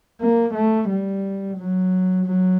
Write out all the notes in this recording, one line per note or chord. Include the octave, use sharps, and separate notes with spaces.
A#3
A3
G3
F#3
F#3